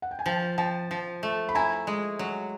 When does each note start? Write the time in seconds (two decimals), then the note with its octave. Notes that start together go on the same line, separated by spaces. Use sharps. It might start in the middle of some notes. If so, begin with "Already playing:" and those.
0.02 F#5
0.11 G5
0.19 G#5
0.26 F3 G5 A5
0.58 F3 G5 A5
0.91 F3
1.23 A3
1.49 B5
1.55 E4 G#5 A#5
1.87 G#3
2.19 F#3